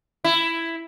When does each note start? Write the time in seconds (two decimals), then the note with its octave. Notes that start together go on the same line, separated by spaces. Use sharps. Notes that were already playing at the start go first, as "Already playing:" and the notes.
0.24 E4